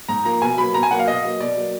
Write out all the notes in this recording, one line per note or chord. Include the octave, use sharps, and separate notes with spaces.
G#2 A#5
F3 A#3 A#5
B2 G#5
F#3 A#3 B5
B2 A#5
G#5
F#3 A#3 F#5
F5
B2 D#5
F#3 A#3
B2 D5
F#3 A#3